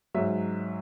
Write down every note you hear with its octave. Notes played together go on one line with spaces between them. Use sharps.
G#2 F#3 E5